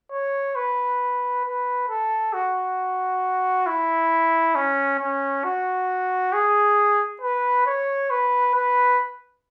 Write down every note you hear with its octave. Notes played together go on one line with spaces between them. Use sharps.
C#5
B4
B4
A4
F#4
E4
C#4
C#4
F#4
G#4
B4
C#5
B4
B4